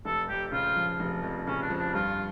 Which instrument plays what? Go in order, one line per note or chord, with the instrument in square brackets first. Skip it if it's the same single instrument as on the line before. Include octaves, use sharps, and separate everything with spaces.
[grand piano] F1 [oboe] A4
[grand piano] F2 [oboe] G4
[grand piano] C#3 [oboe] F4
[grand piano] F3
F1
F2
[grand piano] C#3 [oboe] C#4
[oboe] D4
[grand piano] F3
[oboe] D4
[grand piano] G2 [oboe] F4